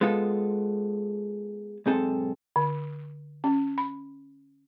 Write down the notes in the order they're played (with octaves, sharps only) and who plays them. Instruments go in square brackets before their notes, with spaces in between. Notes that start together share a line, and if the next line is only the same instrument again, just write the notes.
[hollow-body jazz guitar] G#3 B3 F4 A4
B1 G#2 C4 G#4 A4
[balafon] D3
C#4
B5